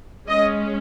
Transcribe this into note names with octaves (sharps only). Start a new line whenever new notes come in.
G#3 C#4 D#5